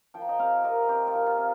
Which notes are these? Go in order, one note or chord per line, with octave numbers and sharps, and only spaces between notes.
F3 G5
A#5
D#5 G5
C3 C5 F5
C3 A#4 D#5
C4 G4 C5
F4 A#4
F3
F4
C3